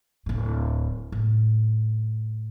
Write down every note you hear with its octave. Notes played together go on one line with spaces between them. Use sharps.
D1 A2
A2